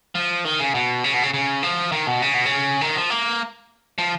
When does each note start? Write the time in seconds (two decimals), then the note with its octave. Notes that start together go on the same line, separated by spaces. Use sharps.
0.15 F3
0.45 D#3
0.60 C#3
0.75 B2
1.04 C#3
1.14 B2
1.23 C#3
1.34 C#3
1.63 F3
1.92 D#3
2.07 B2
2.22 C#3
2.34 B2
2.45 C#3
2.81 D#3
2.95 F3
3.10 A#3
3.98 F3